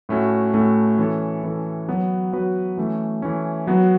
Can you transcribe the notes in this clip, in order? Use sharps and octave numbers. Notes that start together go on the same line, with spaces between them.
A2 A3 C#4 F#4
A2 A3 C#4 F#4
E3 C#4 A4
E3 C#4 A4
F#3 B3 F#4 B4
F#3 B3 F#4 B4
E3 A3 C#4
E3 A3 C#4
F#3 B3 F#4 B4